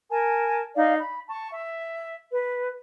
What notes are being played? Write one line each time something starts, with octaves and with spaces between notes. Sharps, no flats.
A#4 G#5 A5
D#4 D5 F5
B5
A5 C#6
E5
B4